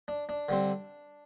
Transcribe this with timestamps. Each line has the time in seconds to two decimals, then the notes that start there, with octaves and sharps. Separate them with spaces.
0.08 D4
0.29 D4
0.49 D3 G3 C4